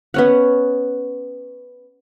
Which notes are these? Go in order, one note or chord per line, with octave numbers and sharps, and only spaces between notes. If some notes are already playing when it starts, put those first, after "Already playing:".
B3 C#4 F#5